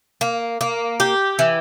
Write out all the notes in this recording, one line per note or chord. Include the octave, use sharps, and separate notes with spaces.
A#3
A#3
G4
E3